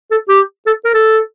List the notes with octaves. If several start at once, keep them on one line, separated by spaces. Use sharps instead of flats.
A4
G4
A4
A#4
A4